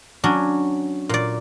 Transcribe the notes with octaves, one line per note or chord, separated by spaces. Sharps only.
F#3 C#4 D4
A#2 D5